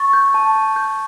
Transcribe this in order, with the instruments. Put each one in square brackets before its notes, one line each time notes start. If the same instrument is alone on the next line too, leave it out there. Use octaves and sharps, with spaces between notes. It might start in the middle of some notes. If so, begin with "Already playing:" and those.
Already playing: [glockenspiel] C#6 A6
G6
A5
A5
G6